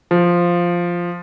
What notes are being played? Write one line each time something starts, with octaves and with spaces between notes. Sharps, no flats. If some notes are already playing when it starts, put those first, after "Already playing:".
F3